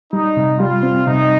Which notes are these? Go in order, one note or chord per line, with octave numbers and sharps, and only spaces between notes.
G3 D#4
C3
G3 F4
C4
C3 D#4